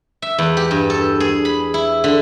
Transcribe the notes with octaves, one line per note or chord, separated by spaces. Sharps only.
E5
E2
G4
G2
A4
G#4
B5
E4
D3